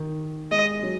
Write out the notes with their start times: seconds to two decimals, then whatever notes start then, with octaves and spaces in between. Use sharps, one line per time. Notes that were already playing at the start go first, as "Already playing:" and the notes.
Already playing: D#3
0.51 G#3 D#5
0.83 F#3